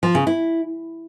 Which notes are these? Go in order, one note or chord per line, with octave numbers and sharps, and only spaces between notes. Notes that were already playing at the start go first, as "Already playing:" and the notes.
F3
C#3
E4